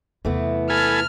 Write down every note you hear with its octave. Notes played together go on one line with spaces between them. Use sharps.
E2 C3 E3 A3 B3
A4 G#5 B5 F6